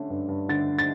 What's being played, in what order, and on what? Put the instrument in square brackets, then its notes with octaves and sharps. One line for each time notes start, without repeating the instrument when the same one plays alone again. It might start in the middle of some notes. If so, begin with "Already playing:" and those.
Already playing: [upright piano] D3 A3 C#4
G2
G2
D3 A6
A6